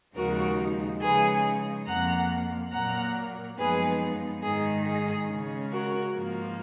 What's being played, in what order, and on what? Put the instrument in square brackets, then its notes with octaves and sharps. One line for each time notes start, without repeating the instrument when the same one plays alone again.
[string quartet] D#2 C#3 F3 G#3 D#4 F#4 A#4
C#3 F3 G#3 D#4 G#4 B4
F2 F3 A#3 F#5 A#5
A#2 F#3 A#3 F#5 A#5
F#2 F3 G#3 B3 D#4 G#4 B4
G#2 D#3 G#3 D#4 G#4
G#4
C#3 G#3 C#4
F#4 A#4
G#2 F3 A#3